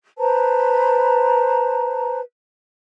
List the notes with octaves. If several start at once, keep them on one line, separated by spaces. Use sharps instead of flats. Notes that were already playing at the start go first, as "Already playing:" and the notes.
B4 C5 A5 A#5